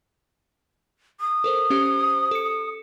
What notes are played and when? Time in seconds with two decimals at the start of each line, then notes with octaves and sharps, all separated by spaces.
1.20 D#6
1.44 A4 A#4 C5
1.70 C#4 G4 C5
2.31 A4 C#7